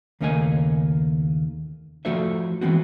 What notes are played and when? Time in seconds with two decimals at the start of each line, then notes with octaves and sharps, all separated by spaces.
0.21 D#2 C#3 A3 A#3 D#5 G#5
2.05 F3 A3 F#4 A4 C5 E5
2.61 E3 G#3 B3 C4 F#4